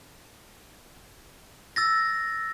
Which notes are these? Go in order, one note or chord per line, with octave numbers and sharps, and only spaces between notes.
E6 A6 A#6